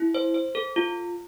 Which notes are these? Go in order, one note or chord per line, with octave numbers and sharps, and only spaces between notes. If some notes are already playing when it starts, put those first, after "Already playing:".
Already playing: E4
C5
C5
A4
F4